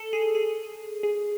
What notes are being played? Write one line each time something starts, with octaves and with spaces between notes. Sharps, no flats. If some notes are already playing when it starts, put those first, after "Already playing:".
Already playing: A4
G#4
G#4
G#4